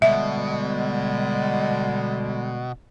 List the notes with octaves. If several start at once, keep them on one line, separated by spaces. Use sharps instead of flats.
B2 D3 G3 G#3 E5